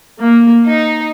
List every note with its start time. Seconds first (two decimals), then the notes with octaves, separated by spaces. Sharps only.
0.20 A#3
0.67 D#4